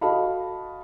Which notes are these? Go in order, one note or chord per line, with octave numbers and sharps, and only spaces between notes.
F#4 A4 D#5 F5 A5 B5